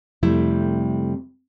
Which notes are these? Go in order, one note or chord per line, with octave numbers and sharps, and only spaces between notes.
F2 C3 G3 A3 E4